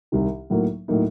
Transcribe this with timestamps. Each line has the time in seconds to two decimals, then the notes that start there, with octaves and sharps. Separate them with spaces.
0.12 C2 C3 D#3
0.50 A2 F#3 A#3 D#4
0.88 A2 F#3 A#3 D#4